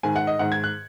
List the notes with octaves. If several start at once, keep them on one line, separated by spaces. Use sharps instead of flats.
G#2 D#3 G#5
F#5
D#5
G#2 D#3 F#5
G#6
F#6